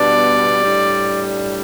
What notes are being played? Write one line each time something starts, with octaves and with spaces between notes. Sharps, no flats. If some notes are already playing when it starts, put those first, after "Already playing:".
Already playing: B2 G3 B3 D4 D5
A2 G3 D4